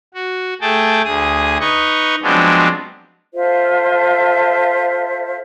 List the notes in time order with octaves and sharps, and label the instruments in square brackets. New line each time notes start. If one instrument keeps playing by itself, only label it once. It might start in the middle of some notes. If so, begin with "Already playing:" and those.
[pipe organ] F#4
A3 G#4 G5 A5
D2 G#4 D#6
D#4 B4 D#5 C#6
F3 F#3 G#3 B3 C4 D4
[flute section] F4 A4 C5 E5